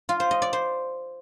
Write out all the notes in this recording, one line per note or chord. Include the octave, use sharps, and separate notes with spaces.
F4
C5
D#5
D5
C5